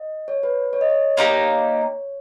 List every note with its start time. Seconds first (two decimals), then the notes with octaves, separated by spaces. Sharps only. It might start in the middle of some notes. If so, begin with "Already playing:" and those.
Already playing: D#5
0.28 C#5
0.43 B4
0.73 C#5
0.81 D#5
0.90 C#5
1.17 A#3 D#4 G4